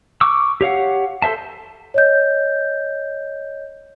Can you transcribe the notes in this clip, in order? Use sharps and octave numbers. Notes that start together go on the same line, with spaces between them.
C#6 D6 E6
G4 C#5 F5 F#5
A4 C5 E5 A5
C#5 D#5 G6